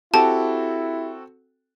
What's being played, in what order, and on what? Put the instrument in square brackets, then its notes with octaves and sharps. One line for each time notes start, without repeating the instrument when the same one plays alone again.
[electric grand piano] C4 F#4 A4 [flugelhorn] E4 [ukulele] G4 [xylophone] A5